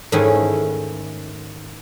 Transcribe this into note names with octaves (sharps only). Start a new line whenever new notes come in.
G#2 D#3 A3 C#4 D#4 E4